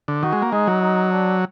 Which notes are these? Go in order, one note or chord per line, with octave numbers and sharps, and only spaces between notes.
D3
D#3 F#4
G#3
A#3
G#3 D#4
F#3
D#4
D4